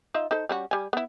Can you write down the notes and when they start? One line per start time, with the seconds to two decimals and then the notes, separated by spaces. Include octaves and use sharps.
0.14 D#4 F4 E5
0.31 D#4 A4 C5
0.49 G3 C#4 F#4
0.71 G3 G#5
0.93 B3 E4